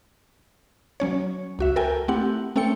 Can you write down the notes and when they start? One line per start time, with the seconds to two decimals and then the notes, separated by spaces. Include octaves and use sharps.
1.00 F#3 C#4 C#5
1.59 C#2 F#4 E5
1.76 A4 A#4 G5 G#5
2.08 A3 C4 E4 G4 F#5
2.56 A3 C4 C#4 A4 G5 C#7